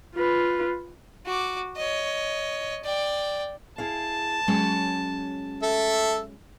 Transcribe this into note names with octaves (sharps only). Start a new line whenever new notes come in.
F4 B4
F#4 D6
C#5 D#5
D5 G5
E4 G#4 F5 A5
F#3 G#3 C#4
A4 E5